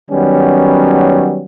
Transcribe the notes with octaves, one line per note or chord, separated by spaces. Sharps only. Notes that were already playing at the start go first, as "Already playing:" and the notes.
D#3 F#3 G3 B3 C#4